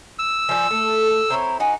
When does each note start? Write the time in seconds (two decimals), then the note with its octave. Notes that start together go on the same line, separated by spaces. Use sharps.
0.19 E6
0.49 F3 G3 G#5
0.71 A3 A4
1.30 C4 E4 C#5 A#5
1.60 D#4 F#4 G#5